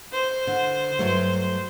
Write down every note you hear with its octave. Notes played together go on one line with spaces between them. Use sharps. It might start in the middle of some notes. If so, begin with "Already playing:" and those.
C5
D3
G2 F#3 A3